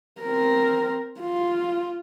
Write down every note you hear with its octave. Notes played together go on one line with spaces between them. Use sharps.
C4 A#4
F4